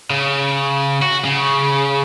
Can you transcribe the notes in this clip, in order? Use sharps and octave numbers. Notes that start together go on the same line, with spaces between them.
C#3
F#4
C#3